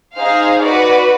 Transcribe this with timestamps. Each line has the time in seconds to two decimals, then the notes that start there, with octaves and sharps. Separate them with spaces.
0.15 D#4 G#4 C5 F5
0.62 F#4 B4 D5